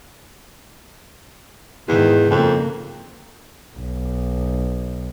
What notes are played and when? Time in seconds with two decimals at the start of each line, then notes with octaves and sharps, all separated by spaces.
1.88 E2 G#2 D#3
2.30 F2 C#3 A#3
3.77 B1